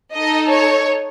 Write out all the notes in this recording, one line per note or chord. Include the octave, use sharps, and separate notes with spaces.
D#4 A4 D#5
C#5